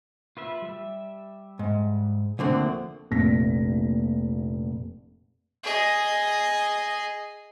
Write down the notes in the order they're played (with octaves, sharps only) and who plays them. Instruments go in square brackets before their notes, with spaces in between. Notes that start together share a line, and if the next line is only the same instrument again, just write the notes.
[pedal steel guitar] F4 B4 E5
G3 E5
[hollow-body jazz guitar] G#2
[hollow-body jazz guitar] D2 D3 C4 [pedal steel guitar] F3 A#3 F#5
[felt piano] F1 A#1 A#6 B6
[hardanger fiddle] G#4 D#5